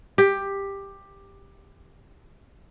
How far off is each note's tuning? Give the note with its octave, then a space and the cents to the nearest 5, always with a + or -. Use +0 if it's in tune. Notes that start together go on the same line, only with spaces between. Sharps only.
G4 +10